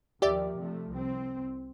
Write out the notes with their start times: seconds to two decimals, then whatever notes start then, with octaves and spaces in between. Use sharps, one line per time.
0.22 D#2 D#3 F3 G4 D5 E5
0.57 C3 F3 A3
0.90 C2 C4